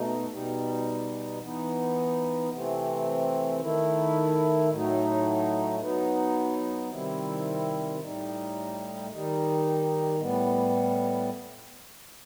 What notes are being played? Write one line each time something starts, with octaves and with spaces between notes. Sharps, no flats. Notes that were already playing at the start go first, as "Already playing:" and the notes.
Already playing: B2 A3 D#4
B2 G3 D#4
E3 B3 D#4
C3 E3 A3 C4
D#3 A3 E4
A2 F#3 A3 D#4
F#3 B3 D#4
C3 D#3 G3 C4 E4
A2 G3 D#4
D#3 G3 D#4
A2 G3 B3